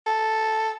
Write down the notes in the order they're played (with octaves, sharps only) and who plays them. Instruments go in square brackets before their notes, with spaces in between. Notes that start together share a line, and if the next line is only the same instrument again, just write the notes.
[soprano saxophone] A4